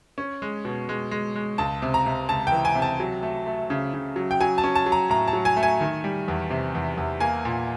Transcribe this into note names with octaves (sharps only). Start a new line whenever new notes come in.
C#4
G#3
B2
G#3
G#3
G#3
C#2 A5
C3
A#5
C3
C#2 A5
G5
E3
G#5
C3
A5
F#3
A3
A3
C#3
C#3
F#3
G5
F#3 G#5
A5
C#4
A5
F#3
A#5
A2 A#5
A5
F#3
G#5
A3
G#5
D#3
G3
E2
C3
E2
E2
A#3 G#5
A#2